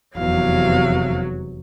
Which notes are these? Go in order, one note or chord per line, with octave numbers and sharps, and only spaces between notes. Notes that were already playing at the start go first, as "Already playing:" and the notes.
F1 E2 C3 F#3 F5